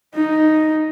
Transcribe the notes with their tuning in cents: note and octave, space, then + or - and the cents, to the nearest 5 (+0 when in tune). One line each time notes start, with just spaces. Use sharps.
D#4 +0